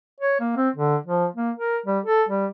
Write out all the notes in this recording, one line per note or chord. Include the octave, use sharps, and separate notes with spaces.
C#5
A#3
C4
D3
F3
A#3
A#4
G3
A4
G3